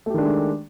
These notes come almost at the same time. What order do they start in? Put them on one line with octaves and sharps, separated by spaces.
A3 G4 D#3 D4 G#3